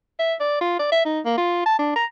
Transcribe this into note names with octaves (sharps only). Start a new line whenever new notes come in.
E5
D5
F4
D5
E5
D#4
A#3
F4
A5
D4
A#5